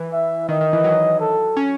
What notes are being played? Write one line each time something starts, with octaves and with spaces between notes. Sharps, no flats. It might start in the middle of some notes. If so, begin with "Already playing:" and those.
Already playing: E3
E5
D#3 D#5
D#3
E3
F#3
A4
C#4